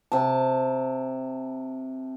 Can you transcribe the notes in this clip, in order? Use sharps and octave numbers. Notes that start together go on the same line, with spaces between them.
C3 A5